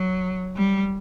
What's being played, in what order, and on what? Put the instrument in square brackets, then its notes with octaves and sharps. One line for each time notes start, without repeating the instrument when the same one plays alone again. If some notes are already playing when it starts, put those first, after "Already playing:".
Already playing: [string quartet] F#3
G3